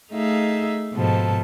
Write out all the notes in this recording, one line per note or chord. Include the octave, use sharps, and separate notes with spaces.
A3 D#4 G#4 E5 F5
G#2 B2 F3 A4